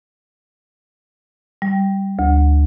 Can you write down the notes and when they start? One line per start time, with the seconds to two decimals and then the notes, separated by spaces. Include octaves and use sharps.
1.62 G3
2.19 D2